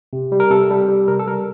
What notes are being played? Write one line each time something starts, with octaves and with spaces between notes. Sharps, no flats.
C3
G3
A#4
C3 A4
G3
G3
C3 A#4
A4
G3 A#4